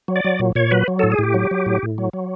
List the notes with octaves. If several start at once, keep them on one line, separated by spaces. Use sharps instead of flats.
F#3
D5
F#3
A#2
A#2 C#5
F#3 B4
F#3
A2 A4
G#4
A2 G4
F#3
F#3
A2
A2
F#3
F#3